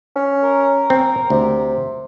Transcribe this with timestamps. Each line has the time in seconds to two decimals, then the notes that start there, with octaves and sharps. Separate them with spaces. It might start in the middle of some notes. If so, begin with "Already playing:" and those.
0.16 C#4
0.43 A#4
0.90 C4
1.30 D2 C3